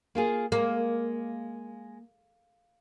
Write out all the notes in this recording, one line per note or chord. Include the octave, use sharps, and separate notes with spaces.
A#3 F4 G#4
G#3 A#3